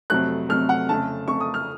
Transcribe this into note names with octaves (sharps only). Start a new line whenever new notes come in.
F2 C3 F#3 A3 F#6
F2 C3 F#3 A3 F6
F#5
F2 C#3 A3 A5
F2 C#3 A3 C#6
D#6
F6